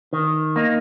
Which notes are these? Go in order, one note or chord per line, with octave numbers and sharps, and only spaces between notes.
D#3
A#3 D#4